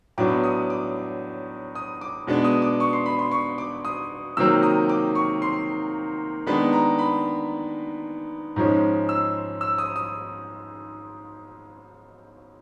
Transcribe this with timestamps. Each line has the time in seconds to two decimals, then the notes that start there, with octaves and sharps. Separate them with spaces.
0.18 A2 F#3 B3 D4 D6
0.44 D#6
0.70 D6
1.75 D#6
2.01 D6
2.27 B2 G#3 B3 D4
2.44 D#6
2.62 D6
2.80 C#6
2.93 C6
3.06 B5
3.19 C6
3.32 C#6
3.58 D6
3.85 D#6
4.37 C3 D#3 F#3 A#3 E6
4.63 D#6
4.89 D6
5.15 C#6
5.42 C6
6.46 D#3 G#3 B3 D4 B5
6.73 A#5
6.99 B5
8.56 G#2 F3 G#3 C#4
9.09 E6
9.61 E6
9.78 D#6
9.96 D#6